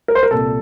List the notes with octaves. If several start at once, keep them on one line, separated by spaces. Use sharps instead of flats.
A#4
C5
A#4
C2 A#2 A4